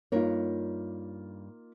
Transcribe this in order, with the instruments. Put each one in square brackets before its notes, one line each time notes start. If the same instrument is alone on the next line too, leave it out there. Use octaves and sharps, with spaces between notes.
[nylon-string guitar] G2 A#4 C#5 [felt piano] A#3 D#4 F4